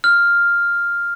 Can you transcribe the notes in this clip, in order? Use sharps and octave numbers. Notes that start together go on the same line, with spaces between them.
F6